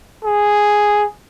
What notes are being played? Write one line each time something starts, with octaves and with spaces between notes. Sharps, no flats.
G#4